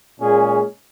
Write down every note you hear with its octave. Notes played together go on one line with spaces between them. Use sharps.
A#2 G#3 C#4 G#4